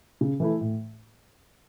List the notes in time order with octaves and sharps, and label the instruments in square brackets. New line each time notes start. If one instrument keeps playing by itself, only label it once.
[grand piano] C#3
E3 A3 E4
A2